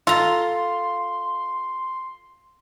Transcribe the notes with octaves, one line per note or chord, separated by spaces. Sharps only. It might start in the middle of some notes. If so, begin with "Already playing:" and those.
F4 A4 A#5 C6